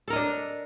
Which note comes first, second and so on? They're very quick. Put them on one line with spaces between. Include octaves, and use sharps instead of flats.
A4 A#4 D#5 D4